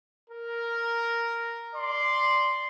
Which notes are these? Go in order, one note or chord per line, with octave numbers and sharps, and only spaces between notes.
A#4
D5 C6